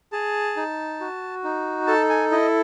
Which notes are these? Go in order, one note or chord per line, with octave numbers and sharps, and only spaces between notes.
G#4 A5
D#4
F#4
D#4
A4 A5
G#5
E4 D#5